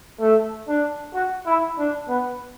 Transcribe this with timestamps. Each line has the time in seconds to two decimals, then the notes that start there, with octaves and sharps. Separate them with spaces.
0.21 A3
0.68 D4
1.14 F#4
1.46 E4
1.78 D4
2.09 B3